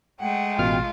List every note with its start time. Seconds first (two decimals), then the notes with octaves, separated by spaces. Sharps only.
0.20 G#3 A3 F#5 G5
0.59 A1 B2 F4 F6